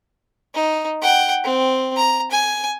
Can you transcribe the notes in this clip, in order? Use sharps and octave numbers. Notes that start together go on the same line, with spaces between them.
D#4
F#5 G5
C4
A#5
G#5